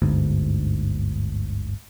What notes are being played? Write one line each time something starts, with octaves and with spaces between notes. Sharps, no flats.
G1 D2 G#2